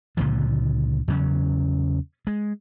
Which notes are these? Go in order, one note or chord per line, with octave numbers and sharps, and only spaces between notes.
C#2 A#2 D3 F3
E2 C#3 F#3 C#4
G#3